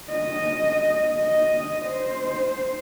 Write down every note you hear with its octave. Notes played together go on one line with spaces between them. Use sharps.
D#5
D#5
C5